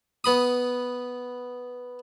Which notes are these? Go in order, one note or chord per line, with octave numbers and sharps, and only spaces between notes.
B3 B5 D#6